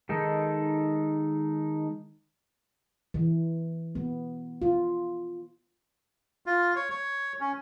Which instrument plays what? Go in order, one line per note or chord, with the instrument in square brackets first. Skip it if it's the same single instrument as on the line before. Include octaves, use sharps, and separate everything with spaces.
[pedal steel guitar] D#3 G#3 D#4 A4
[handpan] E3
B3
F4
[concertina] F4
C#5
C#5
C#4